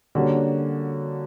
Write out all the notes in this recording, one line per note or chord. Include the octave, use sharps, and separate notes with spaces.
D3 G3 A#3 C#4 F#4